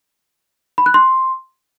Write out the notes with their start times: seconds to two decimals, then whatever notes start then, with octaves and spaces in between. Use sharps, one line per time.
0.78 B5
0.86 F#6
0.94 C6